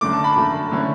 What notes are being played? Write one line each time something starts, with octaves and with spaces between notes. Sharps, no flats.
F#2 D3 A3 D6
A5
B5
F#2 D3 A3
D3 A3 C#4 E4